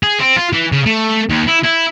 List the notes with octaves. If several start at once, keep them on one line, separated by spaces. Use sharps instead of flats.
G#4
C4
F4
E3
C#3
A3
D#2
E4
E4